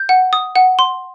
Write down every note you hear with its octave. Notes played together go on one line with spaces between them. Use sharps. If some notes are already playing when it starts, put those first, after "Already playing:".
Already playing: G6
F#5
D#6
F#5
C6